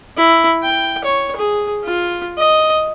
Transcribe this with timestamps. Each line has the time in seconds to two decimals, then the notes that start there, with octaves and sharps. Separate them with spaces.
0.17 E4
0.63 G5
1.05 C#5
1.36 G#4
1.84 F4
2.38 D#5